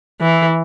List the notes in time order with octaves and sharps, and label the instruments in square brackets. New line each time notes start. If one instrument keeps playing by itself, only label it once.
[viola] E3